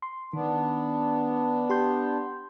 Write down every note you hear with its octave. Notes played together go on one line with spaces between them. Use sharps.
C6
D#3 B3 D4
G4 C6 G6